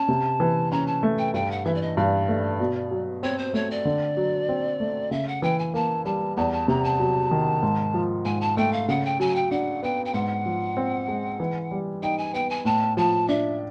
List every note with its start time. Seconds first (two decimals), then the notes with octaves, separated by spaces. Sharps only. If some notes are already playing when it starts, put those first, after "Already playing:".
Already playing: C#4 A5
0.08 C3
0.40 E3
0.71 C#4 A#5
0.86 A5
1.03 A3
1.18 G5
1.34 G2 G5
1.51 F#5
1.65 E3 E5
1.74 D5
1.81 D#5
1.97 G2 D5
2.29 A3
2.60 B2
2.91 F#3
3.23 C4 C#5
3.38 C5
3.54 A3 C#5
3.70 D5
3.85 D3
4.17 F#3
4.49 C4
4.80 A3
5.11 C#3 E5
5.27 F#5
5.42 E3 G5
5.59 G#5
5.74 A#3 A5
6.05 G3 A5
6.36 E2 A5
6.52 A5
6.68 C3 A#5
6.84 A5
7.00 F#3
7.31 D#3
7.63 G#2
7.94 F3
8.25 G#2 G#5
8.41 A5
8.57 A3 G5
8.72 F5
8.88 C#3 F#5
9.05 G5
9.20 F#3 G#5
9.35 G5
9.51 D4 F#5
9.83 B3 G5
10.05 G5
10.13 G#2 F#5
10.46 F3
10.77 C4
11.08 G#3
11.40 E3
11.71 G3
12.02 D#4 G5
12.18 G#5
12.34 B3 G5
12.49 G#5
12.65 A2 A5
12.97 F3 A5
13.28 D4 E5